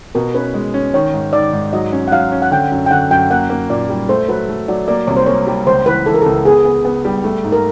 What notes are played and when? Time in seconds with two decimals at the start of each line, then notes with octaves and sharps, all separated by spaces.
0.15 B2 A#4
0.35 C#4 B4
0.54 G#3
0.74 C#4
0.94 D#3 C#5
1.13 G#2
1.33 D#3 D5
1.53 G#2
1.73 F#3 D#5
1.92 C#4
2.08 F#5
2.12 F#3 F5
2.32 C#4
2.42 F#5
2.51 D3 G5
2.72 F#2
2.86 G5
2.91 D3 F#5
3.11 F#2 G5
3.30 A#3 F#5
3.50 A#3
3.69 A#2 D5
3.89 G3
4.09 A3 C5
4.29 F#3 B4
4.49 A3
4.68 F#3 D5
4.88 A#3 D5
5.07 C2 C#5
5.17 C5
5.26 A#3 C#5
5.47 G3
5.66 C#2 C5
5.86 E3 B4
6.06 E3 A4
6.14 A#4
6.22 C#2 A4
6.45 B3 G#4
6.65 B3
6.85 B3
7.05 G3
7.24 A3
7.44 G#2
7.52 A#4